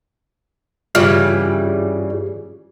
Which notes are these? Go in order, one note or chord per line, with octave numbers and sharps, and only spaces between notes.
G2 C#3 E3 G3 F4 F6